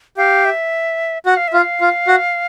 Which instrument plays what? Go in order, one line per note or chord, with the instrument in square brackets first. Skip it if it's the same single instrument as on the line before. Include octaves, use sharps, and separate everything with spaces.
[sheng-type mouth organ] G4 [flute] F5
[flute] E5
[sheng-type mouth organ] F#4 [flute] F#5
[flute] F5
E5
[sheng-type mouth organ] F4
[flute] F5
[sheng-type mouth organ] F4
F#4